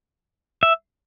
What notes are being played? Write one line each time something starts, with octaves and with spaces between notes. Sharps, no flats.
E5